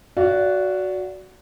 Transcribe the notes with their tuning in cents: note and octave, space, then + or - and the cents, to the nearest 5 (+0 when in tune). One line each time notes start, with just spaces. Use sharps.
F#4 +0 D5 -25 F5 -45